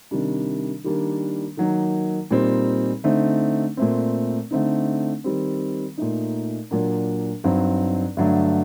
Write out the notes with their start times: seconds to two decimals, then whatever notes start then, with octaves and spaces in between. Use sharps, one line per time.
0.11 C3 D#3 G3 D4
0.84 D#3 G3 A#3 D4
1.57 D#3 F#3 A#3 D#4
2.31 A#2 G3 C4 D#4
3.04 D3 A3 C4 D#4
3.77 A#2 A3 C4
4.51 D3 A3 C4 D#4
5.24 D#3 G3 C4
5.98 A#2 A3 D#4
6.71 A#2 F#3 A#3 D4
7.44 G2 F#3 C4 D#4
8.17 G2 D3 F#3 A3 D4